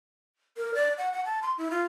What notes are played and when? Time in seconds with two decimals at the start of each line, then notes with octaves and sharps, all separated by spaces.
0.58 A#4
0.75 D5
0.98 F#5
1.13 F#5
1.25 A5
1.43 C6
1.58 E4
1.71 F4